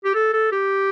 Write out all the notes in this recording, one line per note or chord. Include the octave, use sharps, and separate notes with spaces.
G4
A4
A4
G4